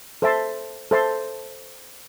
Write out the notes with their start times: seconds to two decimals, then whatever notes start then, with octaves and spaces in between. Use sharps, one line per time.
0.22 A4 C5 E5 A5 C6
0.91 A4 C5 E5 A5 C6